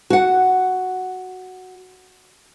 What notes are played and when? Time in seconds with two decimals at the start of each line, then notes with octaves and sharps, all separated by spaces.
0.10 F#4 F#5